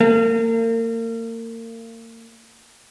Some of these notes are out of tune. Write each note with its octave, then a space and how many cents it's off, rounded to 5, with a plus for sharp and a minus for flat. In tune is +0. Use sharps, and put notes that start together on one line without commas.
A#3 -35